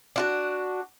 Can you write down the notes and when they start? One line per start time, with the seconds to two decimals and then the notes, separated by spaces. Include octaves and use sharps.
0.16 D4 F4 F#4